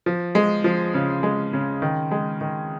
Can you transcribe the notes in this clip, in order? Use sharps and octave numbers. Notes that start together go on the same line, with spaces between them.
F3
G#3
F3
C#3
G#3
C#3
D#3
G#3
D#3